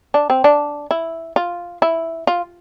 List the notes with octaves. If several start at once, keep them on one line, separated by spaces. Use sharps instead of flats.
D4
C4
D4
E4
F4
E4
F4